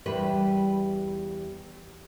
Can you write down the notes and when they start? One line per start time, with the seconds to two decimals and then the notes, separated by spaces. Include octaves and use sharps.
0.06 E2 G3 B4